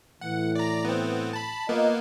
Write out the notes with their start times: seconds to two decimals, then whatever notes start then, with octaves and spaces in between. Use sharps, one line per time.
0.21 A2 E3 F#5
0.55 D5 A#5
0.85 B3 C4
1.33 A5 B5
1.69 A#3 B3 F4 A#4 D#5